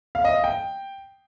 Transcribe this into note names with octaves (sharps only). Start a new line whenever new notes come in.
F5
D#5
F5
G5